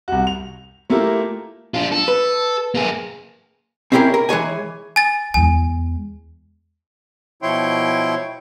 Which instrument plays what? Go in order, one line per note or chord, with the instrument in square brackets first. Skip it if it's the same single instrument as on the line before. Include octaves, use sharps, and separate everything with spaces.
[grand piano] C2 F#4
F7
A3 A#3 E4 F4 G4 A#4
[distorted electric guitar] D4 F4
A4
[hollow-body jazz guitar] B4
[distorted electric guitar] A#3 G#4
[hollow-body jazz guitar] C4 C#4 E4 G4 G#4 A#4
A#4
E3 G#3 C#5 G#5
[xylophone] G#5 A6
[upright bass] E2 G#3 [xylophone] G#5
[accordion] B2 F3 E4 C#5 G5 C6